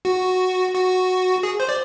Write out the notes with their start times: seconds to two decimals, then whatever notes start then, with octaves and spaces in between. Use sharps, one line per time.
0.05 F#4
0.74 F#4
1.43 G#4
1.60 C5
1.69 D5